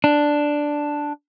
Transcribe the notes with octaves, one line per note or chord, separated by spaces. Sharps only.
D4